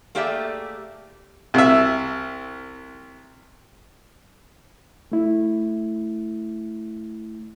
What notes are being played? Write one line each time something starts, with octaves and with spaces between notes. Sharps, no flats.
A3 A#3 G4 G#4 D5 E5
C2 E5
A3 E4